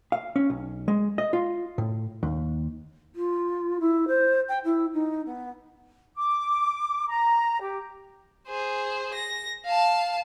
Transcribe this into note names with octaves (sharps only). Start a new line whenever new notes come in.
F5
C#4
B1
G#3
D#5
F4
A2
D#2
F4
E4
C5
G5
E4
D#4
B3
D6
A#5
G4
G#4 C5
A#6
F5 A5